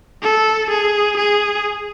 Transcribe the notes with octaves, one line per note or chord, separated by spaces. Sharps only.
A4
G#4
G#4